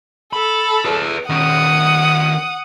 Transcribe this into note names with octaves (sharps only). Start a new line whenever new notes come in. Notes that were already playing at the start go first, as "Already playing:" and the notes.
A4 B5
G#4 B4
D#3 C#4 F#5 D#6